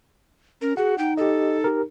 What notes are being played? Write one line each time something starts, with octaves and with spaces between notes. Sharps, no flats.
C#4 A#4
F#4 G#4 F#5
D#4 G5
G4 A4 D#5
G4 A#4